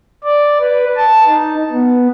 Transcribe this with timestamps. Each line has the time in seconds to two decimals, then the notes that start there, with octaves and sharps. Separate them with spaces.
0.24 D5
0.60 B4
0.96 A5
1.26 D#4
1.71 B3